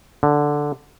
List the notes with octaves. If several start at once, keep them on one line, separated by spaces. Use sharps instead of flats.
D3